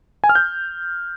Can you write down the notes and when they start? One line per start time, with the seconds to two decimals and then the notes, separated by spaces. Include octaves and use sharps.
0.24 G#5
0.29 F6
0.35 G6